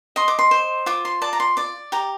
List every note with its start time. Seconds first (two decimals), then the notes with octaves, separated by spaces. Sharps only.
0.16 D#5 C6
0.28 D6
0.39 C6
0.51 C5
0.86 F4 D6
1.05 C6
1.22 D5 A5
1.33 A#5
1.40 C6
1.57 D5 D6
1.92 G4 A#5